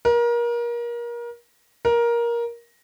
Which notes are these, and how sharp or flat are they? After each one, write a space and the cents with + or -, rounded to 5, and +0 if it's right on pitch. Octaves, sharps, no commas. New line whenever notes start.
A#4 +30
A#4 +15